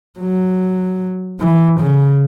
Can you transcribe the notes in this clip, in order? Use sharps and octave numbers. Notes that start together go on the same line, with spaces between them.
F#3
E3
C#3